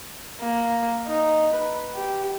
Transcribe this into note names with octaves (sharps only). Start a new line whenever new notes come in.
A#3
D#4
B4
G4